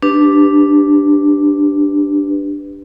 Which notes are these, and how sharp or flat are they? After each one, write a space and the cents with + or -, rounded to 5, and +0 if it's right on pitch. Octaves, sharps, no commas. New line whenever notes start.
D4 +0 G4 +0 B4 +0